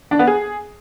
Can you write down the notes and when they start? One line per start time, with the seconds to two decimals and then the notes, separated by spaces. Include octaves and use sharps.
0.11 D4
0.19 B3
0.27 G#4